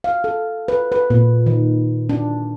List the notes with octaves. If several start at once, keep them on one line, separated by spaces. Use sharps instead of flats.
F5
A4
B4
B4
A#2
D#3
D4